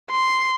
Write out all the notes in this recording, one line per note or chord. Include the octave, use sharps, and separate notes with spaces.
C6